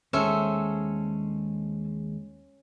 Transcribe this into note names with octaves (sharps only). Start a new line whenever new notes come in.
D#2 G#3 C#4 A4 C5 E5